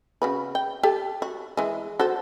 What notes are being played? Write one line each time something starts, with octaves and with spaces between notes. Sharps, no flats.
C#3 F#4 B4
G5
G4 A4
F#4
E3 G#3
F#4 A4 C5